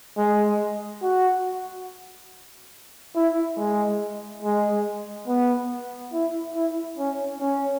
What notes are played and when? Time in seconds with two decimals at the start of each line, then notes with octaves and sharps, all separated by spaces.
0.17 G#3
1.02 F#4
3.16 E4
3.58 G#3
4.43 G#3
5.28 B3
6.13 E4
6.55 E4
6.98 C#4
7.40 C#4